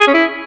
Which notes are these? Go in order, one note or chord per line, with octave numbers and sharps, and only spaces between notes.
G#4
C#4
E4